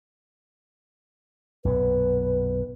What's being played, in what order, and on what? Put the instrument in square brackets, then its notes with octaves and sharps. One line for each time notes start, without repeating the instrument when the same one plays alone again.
[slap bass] B1 F#2 A#2 [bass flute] B4